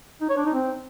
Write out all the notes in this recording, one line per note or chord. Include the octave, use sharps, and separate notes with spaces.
D#4
C#5
D4
D#4
C4